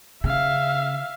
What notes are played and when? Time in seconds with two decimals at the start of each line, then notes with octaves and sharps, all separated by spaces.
0.24 C#3 E5 F5